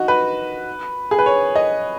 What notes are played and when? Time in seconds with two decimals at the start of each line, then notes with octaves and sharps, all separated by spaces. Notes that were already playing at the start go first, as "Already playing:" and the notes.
Already playing: D#4 F#4
0.08 B4
1.11 G#4
1.19 B4
1.26 C#5
1.56 D#5